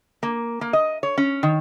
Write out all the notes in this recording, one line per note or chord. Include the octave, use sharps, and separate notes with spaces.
A#3
A#3
D#5
C#5
C#4
D#3